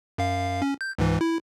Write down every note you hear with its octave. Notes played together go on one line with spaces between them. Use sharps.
F#2 F5
C#4
G6
C#2 G#2 E3
E4